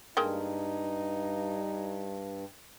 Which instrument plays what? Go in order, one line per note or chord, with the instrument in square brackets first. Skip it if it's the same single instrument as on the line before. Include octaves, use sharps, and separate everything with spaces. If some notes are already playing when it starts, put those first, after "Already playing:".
[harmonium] G2 [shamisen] G#3 A#3 G5 [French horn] D#4